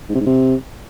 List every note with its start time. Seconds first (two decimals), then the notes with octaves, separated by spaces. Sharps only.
0.09 G#2
0.15 C3
0.21 G#2
0.26 C3